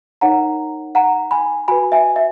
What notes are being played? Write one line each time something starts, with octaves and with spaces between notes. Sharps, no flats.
D#4 A#4 C#5 F#5 A#5
F#5 A#5
G#5 B5
F#4 B4 G#5 B5
E5 G#5
E5